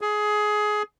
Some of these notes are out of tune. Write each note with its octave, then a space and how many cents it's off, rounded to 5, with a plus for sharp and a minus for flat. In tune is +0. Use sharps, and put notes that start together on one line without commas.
G#4 +20